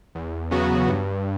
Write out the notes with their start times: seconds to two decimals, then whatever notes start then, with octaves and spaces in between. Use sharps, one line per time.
0.15 E2
0.51 C#3 F#3 B3 F#4
0.88 G2